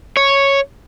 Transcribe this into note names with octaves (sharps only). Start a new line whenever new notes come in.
C#5